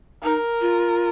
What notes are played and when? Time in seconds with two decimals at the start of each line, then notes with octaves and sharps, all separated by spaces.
0.23 D#4 A#4
0.61 F4